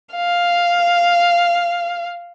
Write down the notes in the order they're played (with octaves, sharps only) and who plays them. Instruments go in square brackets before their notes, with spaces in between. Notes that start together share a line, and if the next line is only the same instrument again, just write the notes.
[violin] F5